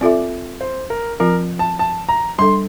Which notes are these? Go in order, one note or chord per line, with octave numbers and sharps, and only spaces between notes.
C4 F4 A4 D5 E5
C5
A#4
F3 C4 F4 A#4
A5
A5
A#5
G3 D4 A4 C6